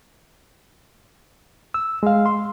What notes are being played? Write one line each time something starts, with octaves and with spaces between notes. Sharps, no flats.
E6
G#3 F5
C6